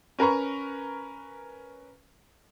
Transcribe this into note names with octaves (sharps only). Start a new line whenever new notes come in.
C#4 A#4 B4 A#5 C#6